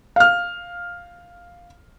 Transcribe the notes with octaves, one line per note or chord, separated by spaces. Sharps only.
F5 F6